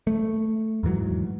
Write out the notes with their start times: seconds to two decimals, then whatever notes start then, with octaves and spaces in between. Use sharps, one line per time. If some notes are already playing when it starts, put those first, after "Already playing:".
0.07 A3
0.83 E2 G#2 E3 F#3